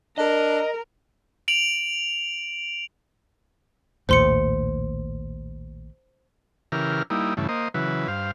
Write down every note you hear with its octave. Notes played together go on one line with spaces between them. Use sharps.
D4 A#4 D#5
D7 F7 F#7
A#1 D#2 A2 C5 C6 C#7
C#3 E3 G4 A#4 F6
G3 A#3 D#4 E4
G2 C#3 E3 A3
A#3 C5 D#5
C#3 E3 F#3 B4
G2 C5 F5